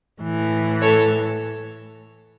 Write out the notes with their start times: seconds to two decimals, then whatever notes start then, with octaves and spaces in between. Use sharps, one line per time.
0.22 A2 E3
0.81 A4 C#5